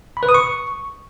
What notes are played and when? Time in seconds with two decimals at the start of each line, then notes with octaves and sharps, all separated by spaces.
0.17 B5
0.23 B4
0.29 D#6
0.34 C#6